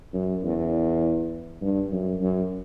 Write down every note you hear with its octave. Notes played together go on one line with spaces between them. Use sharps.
F#2
E2
G2
F#2
F#2